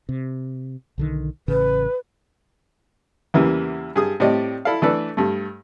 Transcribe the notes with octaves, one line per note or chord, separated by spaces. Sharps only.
C3
B1 D3 D#3
A1 C#3 B4
E2 C#3 E3 G3 A#3
G2 G#4 D#6
A2 G3 C4 G4 D5 D#5
E4 A4 D5 F5
E3 A3 D4 A4 B4 D5
G2 A3